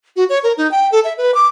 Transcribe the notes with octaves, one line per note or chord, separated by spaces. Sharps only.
F#4
C#5
A#4
D#4
G5
A4
E5
B4
D6